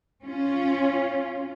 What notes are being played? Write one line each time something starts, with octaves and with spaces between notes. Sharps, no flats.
C#4 F4